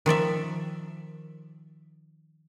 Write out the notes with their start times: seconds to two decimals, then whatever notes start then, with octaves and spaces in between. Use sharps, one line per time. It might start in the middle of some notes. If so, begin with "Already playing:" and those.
0.06 D#3 F3 D5 E5